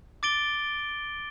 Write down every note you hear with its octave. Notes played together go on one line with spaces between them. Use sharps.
D6 A6 D7 G7